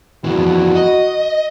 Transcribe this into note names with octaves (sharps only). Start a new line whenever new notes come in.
F2 E3 F#4
D#5